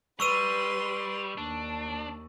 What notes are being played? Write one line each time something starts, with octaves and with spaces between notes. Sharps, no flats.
G3 B4 C6 C#6 E6 D#7
D#2 D4